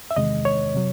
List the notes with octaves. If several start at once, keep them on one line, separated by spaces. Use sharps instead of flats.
E5
E2 C3 D#3 G#3 D#5
C#5
C3 F#3